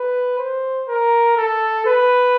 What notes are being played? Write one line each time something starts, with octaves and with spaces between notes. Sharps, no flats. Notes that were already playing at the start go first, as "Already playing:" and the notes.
Already playing: B4
C5
A#4
A4
B4